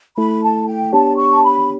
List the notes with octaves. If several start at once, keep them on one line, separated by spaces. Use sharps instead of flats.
A3 E4 A4 B5
A5
G5
B3 D4 G4 C#5 A5
C#6
A5
B5